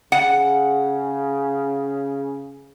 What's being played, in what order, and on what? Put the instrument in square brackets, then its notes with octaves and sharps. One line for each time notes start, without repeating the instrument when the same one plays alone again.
[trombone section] C#3 [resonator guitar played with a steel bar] F#5